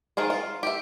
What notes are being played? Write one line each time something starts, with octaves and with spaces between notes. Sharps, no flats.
D#3 F3 F4 G#4
F4
G4 E5